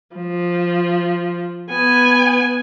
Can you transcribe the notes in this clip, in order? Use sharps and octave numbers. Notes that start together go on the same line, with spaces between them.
F3
B3 G#5